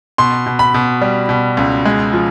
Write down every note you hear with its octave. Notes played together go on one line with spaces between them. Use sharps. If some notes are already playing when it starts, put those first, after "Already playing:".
B2 C6
B2
B5
B2
G3
B2
C#2
G#3
F3